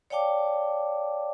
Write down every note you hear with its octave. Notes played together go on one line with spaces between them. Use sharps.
C#5 D5 F5 G5 A5 D6